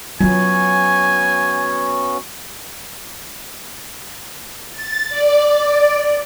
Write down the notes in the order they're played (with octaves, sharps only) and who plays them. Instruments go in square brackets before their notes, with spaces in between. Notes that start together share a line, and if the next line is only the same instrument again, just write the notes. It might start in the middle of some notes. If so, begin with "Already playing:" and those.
[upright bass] F#3 F4 [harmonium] B3 C#4 F#4 [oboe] G#5
[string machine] A6
D5